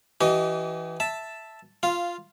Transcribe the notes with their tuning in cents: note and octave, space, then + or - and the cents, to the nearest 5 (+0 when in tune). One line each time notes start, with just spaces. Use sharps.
E3 +0 G4 -45 D#5 +0
E5 +0 A5 +0
F4 +0 F5 -10